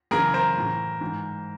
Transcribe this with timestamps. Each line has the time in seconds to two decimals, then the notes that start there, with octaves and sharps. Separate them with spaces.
0.11 F#2 C#3 E3 G#4 A#4
0.34 A#4 C5
0.57 A2 E3
1.01 G#2 E3